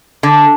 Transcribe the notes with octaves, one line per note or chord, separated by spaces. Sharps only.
D3